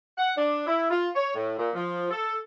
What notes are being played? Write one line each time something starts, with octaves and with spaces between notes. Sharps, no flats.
F#5
D4
E4
F4
C#5
A2
A#2
F3
A4